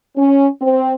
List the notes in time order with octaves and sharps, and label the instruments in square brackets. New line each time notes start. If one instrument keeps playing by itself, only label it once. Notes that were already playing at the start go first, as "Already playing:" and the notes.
[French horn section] C#4
C4